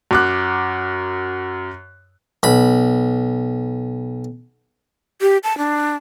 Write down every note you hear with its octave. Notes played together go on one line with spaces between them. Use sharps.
F#2 D6 F#6
B1 B5
G4
A5
D4